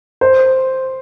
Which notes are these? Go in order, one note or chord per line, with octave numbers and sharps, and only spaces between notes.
C5